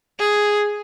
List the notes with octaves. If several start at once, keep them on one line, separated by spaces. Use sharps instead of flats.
G#4